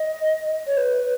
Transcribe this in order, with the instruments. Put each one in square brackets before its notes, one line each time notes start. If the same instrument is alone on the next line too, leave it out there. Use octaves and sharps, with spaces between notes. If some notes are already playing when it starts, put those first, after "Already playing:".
Already playing: [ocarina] D#5
C#5
B4